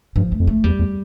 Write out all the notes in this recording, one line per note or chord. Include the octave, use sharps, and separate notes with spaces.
G2 F3
A3
F2
A3
E2 G3
E2